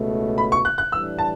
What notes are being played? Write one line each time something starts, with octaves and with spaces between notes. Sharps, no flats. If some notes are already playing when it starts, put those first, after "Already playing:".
Already playing: C#2 B2 A3
B5
C#6
F#6
F#6
A2 E3 G3 D4 E6
A5